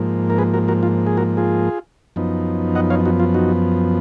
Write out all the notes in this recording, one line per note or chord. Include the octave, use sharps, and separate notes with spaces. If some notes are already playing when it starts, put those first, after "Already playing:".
Already playing: G#2 F3 A#3
A#4
G#4 B4
F#4 A#4
F#4 A#4
F4
G#4
F#4 A#4
F4 G#4
F#2 F3 B3 D#4
D#5 F#5
C#5 F5
D#4 F#4
F4
D#4 F#4